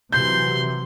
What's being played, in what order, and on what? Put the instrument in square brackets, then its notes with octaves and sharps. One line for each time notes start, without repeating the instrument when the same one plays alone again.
[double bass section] C3 E3 F#3 [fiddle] C6 [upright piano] G6